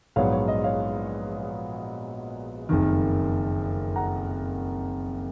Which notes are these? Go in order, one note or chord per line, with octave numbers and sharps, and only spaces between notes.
A#1 G#2 F#3 B3 C#5 F5
C#5
D#5
C#5 F5
F#1 F2 D#3
F#5 A#5